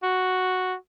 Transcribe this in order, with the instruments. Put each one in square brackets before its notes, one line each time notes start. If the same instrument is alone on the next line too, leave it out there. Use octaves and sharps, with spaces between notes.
[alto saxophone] F#4